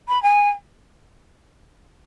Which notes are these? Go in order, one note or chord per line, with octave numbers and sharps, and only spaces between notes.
B5
G#5